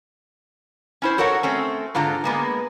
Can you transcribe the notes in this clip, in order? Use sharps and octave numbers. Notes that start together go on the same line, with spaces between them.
C#4 E4 C5
F#4 A4 A#4 C#5 F#5
A3 C4 C#4
G#2 D3 F4 A#5
G#3 A#3 B3